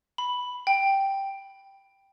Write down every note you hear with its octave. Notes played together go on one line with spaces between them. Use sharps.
B5
G5